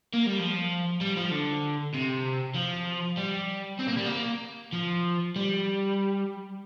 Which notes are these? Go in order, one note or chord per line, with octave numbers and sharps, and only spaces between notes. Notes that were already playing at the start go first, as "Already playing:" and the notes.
A#3
G3
F3
G3
F3
D3
C3
F3
G3
C4
A#3
G3
A#3
F3
G3